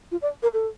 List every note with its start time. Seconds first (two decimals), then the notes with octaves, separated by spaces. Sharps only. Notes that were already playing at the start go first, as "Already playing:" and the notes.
0.11 F4
0.22 D5
0.43 A#4
0.53 A4